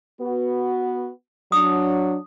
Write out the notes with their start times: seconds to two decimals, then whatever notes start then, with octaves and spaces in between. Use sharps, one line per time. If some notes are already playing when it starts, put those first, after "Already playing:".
0.21 B3 F#4
1.52 F#3 D4 D#6